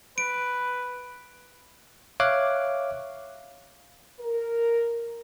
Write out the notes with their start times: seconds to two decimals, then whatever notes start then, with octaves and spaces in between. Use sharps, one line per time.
0.18 B4 D7
2.20 C#5 E5 F5 D6 F#6
4.19 A#4